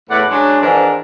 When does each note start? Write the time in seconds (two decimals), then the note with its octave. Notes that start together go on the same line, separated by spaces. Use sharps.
0.10 E2 A2 A3 D5 F#5
0.30 F#3 G#3 C#4 D4
0.61 F2 G#2 E3 D4 A#4 D5